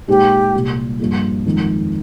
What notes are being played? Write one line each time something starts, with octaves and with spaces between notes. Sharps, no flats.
A#2 G#3 D#4 G4 G#4 C5
C2 A#2 G3
G2 F3 A#3 F4 G#4
F2 D#3 G#3